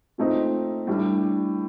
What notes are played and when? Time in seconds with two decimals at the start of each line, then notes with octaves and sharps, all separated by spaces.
0.18 A#2 A3 C4 D#4
0.87 A2 G3 D4